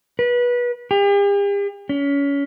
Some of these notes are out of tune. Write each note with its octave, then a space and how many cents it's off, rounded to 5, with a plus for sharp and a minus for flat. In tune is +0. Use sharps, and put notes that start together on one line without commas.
B4 -25
G4 +45
C#4 +25